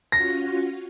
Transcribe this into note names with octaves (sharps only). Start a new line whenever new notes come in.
C#4 F4 F#4 A#6